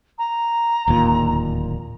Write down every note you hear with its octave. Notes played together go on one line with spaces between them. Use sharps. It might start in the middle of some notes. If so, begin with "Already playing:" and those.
A#5
D1 D#2 A#2